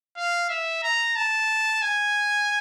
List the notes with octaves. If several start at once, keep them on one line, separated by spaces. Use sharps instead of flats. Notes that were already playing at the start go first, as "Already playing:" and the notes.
F5
E5
A#5
A5
G#5